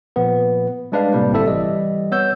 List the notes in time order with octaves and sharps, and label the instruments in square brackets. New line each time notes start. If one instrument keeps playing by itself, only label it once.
[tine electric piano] A#2 F3 B3 B4
G3 G#3 D4 B4 D5 F5
A2 C3 G3 A#3
G1 G#2 C4 E4 A4 E5
E3 G3 D5 D#5
B3 C#5 E6 G6